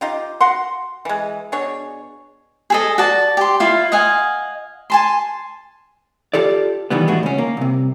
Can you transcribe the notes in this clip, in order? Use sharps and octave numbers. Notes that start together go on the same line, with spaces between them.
D#4 F4 G4
F#4 F5 F#5 C6
E3 G#3
B2 D4 G#4 C#5
G#4 A4 D#5
F#4 D5 A5
G4 C6
E4 F4 F5
D#5 F5 F#5 G#5
G#5 A5 C6
F4 G4 A4 D5
D#3 E3 G3 B3
E2 A2 G#3 D4 F#4
C#2 C#4
A#3
C2 C3